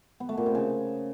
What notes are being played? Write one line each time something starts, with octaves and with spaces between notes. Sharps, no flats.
B3
A3
A#2
C3
C#3